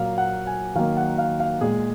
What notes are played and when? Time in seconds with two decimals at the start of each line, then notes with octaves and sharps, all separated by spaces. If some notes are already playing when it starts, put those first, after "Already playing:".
Already playing: A#2 F#3 A#3 F5
0.18 F#5
0.47 G#5
0.75 D#3 F#3 A#3 F5
0.97 F#5
1.18 F5
1.40 F5
1.61 A#2 G#3 G#4